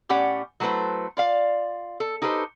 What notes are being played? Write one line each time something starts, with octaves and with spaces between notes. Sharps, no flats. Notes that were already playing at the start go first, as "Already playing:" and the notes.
A2 C#4 G4 D5 F#5
F#3 A3 E4 G4 B4 C5
F4 D5 F5
A4
D#4 G4 A4 B4 C5